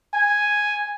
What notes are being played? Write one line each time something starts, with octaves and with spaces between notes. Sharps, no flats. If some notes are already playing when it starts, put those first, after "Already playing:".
G#5